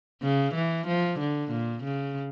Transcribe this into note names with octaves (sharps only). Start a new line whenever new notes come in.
C#3
E3
F3
D3
A#2
C#3